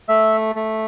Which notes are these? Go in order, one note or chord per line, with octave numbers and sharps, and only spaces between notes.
A3 E5
A3